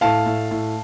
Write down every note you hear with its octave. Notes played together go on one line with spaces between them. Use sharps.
A2 F5 A5
A2
A2